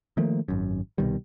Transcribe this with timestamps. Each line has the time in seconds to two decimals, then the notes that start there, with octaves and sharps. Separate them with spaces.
0.17 D#3 F3 A3 A#3
0.48 G#1 F#2
0.98 C2 B2 D#3 G3